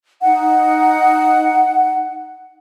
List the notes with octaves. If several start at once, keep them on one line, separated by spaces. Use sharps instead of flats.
D#4 F#5